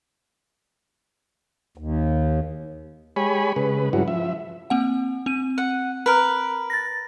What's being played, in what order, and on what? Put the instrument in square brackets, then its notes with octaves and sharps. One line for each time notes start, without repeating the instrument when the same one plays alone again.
[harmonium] D#2
[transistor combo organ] G#3 G4 C#5 G#5 B5
C#3 G#3 B4
G2 F#3 G#3 C#4 E4 F#4
F3 E5
[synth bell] A#3 C4 F#5
C4 D#7
[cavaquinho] F#5
A#4 B4
[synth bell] A6 A#6